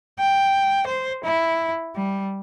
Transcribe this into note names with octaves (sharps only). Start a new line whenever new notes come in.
G5
C5
E4
G3